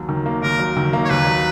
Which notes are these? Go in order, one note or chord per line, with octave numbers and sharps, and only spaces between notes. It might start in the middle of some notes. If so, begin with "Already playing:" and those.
Already playing: D#2 F#3
D#3
A#3
D#2 A#4
F#3
D#3
A#3
C#5
D#2 B4
F#3